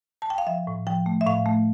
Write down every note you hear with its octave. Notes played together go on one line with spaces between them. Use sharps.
A5
G5
F5
F3 E5
A2
F3 G5
A3
E5
A2 F5
A3